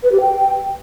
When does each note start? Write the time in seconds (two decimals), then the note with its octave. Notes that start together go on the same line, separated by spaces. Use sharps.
0.03 B4
0.12 G4
0.20 G5